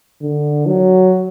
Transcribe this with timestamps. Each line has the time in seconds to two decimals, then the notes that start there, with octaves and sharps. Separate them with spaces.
0.21 D3
0.66 F#3